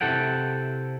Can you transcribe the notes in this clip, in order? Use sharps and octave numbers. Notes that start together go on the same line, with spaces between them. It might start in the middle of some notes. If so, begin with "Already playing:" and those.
C3 E4 A4 F#5 G5